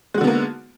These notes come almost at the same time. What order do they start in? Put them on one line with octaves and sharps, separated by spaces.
G#3 F#4 D3 B3 A#3